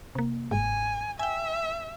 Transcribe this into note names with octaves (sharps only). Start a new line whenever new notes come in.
C3 A#3
G1 G#2 G#5
E5 G5 G#5